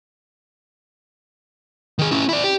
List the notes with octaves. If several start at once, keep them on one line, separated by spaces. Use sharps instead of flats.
D#3 G#4
C#4 E4
E4 D5
G4